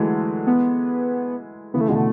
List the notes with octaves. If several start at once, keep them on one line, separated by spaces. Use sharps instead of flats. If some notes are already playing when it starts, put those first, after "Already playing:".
Already playing: D3 E3 F#3 G#3 A3
B3
C#3 E3 B3
A3
B2 D3 G#3
A3